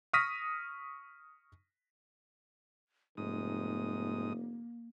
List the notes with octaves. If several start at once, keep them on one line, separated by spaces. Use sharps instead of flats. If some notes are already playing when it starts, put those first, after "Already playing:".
C#6 D#6 F6 A#6 B6 D#7
F1 G#2 A#3 D#6